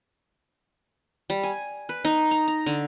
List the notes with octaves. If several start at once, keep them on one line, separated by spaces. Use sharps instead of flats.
G3
G#5
B4
D#4
A#5
A#5
D3